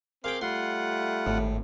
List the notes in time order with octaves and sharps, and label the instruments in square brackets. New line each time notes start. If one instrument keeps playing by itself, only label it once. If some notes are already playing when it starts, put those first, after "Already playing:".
[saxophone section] C4 G#4 A#4 [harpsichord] F5 G5 [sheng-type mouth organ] C6 D6
[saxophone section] G3 A3 [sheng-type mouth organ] F4 F#5 [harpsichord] C6
[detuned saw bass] G#1 [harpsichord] A2